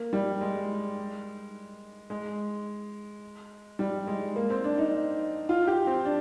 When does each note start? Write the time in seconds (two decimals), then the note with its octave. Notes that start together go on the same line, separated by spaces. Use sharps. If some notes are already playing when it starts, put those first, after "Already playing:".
Already playing: A#3
0.13 G3
0.41 G#3
2.10 G#3
3.79 G3
4.07 G#3
4.36 A#3
4.50 C4
4.64 D4
4.78 D#4
5.49 F4
5.67 G4
5.87 C4
6.05 D4